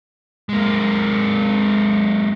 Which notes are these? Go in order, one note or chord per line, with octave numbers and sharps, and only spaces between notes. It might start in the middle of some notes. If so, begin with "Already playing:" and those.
G#3 A#3